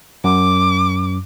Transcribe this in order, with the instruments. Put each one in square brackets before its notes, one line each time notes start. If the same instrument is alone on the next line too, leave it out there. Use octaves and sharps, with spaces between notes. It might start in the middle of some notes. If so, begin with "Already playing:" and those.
[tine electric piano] F#2 [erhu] D6